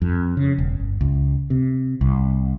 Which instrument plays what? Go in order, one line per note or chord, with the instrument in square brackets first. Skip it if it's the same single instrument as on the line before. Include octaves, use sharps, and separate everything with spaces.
[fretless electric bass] F2
C#3
E1
G1
C#2
C3
C2